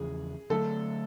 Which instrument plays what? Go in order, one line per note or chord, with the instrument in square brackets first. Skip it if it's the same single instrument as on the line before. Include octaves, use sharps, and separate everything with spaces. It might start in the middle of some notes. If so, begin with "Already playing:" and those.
Already playing: [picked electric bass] E2 C#3 F3 [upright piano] G#4
[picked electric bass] D3 F#3 A3 [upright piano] A4